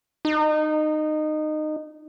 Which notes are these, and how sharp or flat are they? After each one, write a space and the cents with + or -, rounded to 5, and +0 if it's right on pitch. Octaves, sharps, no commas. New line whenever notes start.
D#4 -20